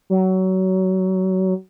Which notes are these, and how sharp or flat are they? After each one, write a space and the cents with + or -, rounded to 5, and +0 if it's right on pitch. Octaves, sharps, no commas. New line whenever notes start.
F#3 +25